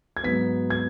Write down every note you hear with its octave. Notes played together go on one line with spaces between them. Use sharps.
G#6
G#2 F#3 B3 B6
G#6